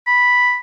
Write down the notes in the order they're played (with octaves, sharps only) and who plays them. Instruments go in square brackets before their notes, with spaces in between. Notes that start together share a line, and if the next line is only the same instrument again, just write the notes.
[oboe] B5